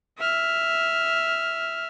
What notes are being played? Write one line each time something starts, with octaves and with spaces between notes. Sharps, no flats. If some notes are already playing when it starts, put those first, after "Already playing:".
E5 F6